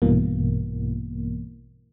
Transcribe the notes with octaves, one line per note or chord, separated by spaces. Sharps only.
A#1 G2 B2 E3 A#3